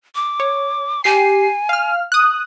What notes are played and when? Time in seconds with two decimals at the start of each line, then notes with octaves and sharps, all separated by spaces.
0.15 D6
0.40 C#5
1.04 G4 G#5 C7
1.69 F5 F6
2.12 D#6 F#6